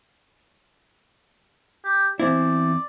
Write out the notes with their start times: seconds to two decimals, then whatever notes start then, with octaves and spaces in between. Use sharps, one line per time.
1.85 G4
2.20 E2 C4 E4 D5